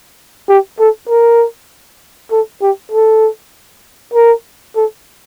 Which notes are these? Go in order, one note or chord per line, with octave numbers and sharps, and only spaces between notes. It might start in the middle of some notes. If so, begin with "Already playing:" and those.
G4
A4
A#4
A4
G4
A4
A#4
A4